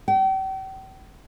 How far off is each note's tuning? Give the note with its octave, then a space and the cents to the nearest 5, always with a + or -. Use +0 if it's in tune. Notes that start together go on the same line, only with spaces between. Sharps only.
G5 -40